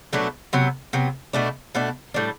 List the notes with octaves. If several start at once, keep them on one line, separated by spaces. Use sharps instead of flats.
B2 F#3 A3 D4
C3 F#3 B3
C3 F#3 B3
B2 A3 D4
B2 A3 D4
A2 G3 D4